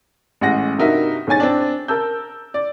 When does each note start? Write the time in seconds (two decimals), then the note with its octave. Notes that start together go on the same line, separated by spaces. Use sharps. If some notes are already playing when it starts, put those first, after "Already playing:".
0.41 A1 G#3 F#5 A#6
0.78 G2 C3 D#4 F#4 A#4 E5
1.27 B1 G#2 C#5 G#5 A6
1.40 C4 D4
1.88 A#4 A5 E6 G6
2.54 D5